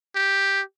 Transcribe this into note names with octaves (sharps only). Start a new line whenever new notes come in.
G4